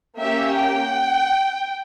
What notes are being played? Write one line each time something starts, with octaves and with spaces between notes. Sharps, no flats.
A#3 C#4 G4 E5
G5